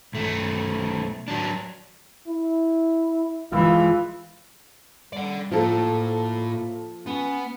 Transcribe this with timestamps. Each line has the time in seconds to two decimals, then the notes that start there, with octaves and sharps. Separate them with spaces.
0.14 B1 A3
1.28 F#3 D4
2.27 E4
3.52 E3 G#3 F4
5.13 G3 D5 F#5
5.51 A2 F3 A#3 A4
7.06 B3 C#4